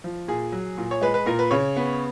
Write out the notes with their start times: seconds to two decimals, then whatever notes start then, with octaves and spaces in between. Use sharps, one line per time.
0.04 F3
0.28 A#2 G#4
0.52 F#3
0.77 A#2
0.91 C#5
1.01 G#3 B4
1.14 B4
1.26 A#2 A#4
1.39 B4
1.51 C#3 C#5
1.76 B3